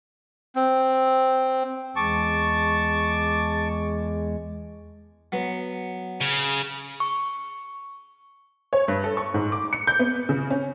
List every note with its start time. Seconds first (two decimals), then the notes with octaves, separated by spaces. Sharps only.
0.55 C4
1.96 E2 G#3 A5 C#6 D6
5.32 F#3 B3
6.21 C#3
7.00 C#6
8.73 C#5
8.88 G2
9.04 A4
9.17 C#6
9.34 G#2
9.52 D6
9.73 C#7
9.87 G6
9.99 B3
10.29 C#3
10.50 C#4